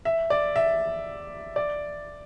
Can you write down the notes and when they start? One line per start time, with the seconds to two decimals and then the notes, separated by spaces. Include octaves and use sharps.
0.05 E5
0.30 D5
0.56 E5
1.56 D5